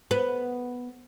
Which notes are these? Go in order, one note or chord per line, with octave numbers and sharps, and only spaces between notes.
B3